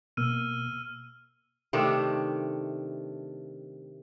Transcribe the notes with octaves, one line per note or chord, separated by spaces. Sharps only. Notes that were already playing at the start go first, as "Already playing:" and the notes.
B2 A#3 E6 F6 D#7
C3 D#3 A3 D4